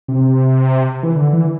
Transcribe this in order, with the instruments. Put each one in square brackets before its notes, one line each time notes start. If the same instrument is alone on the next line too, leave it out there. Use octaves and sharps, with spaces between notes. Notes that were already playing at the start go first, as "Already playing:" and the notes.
[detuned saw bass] C3
E3
D3
E3